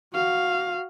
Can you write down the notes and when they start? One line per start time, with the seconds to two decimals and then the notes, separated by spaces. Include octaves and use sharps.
0.13 F#4 F5